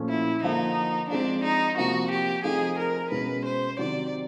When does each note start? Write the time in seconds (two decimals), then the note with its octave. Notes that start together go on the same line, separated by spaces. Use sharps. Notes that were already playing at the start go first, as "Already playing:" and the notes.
Already playing: A#2 F3 A3 C#4
0.09 E4
0.43 D3 F3 A#3 D#4
1.10 F3 G#3 C4 D4
1.44 D#4
1.77 C3 F3 A#3 F#4
2.11 G4
2.44 F3 A3 C4 D#4 G#4
2.78 A#4
3.11 B2 G#3 C#4 B4
3.45 C5
3.79 C3 D#3 F#3 D5